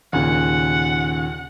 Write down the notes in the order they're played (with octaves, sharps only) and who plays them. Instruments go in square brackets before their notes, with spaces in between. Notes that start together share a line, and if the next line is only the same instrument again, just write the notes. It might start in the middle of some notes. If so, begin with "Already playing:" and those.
[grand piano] D#2 A#2 C#3 [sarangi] F#5